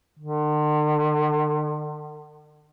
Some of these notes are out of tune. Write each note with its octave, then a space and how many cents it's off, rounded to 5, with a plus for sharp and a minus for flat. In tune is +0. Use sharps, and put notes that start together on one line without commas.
D3 +45